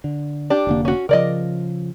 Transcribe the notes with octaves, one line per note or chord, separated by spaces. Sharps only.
D3
D4 G4
F1 D3 A#3
C#4 F#4
C#3 F3 A#4 D5 D#5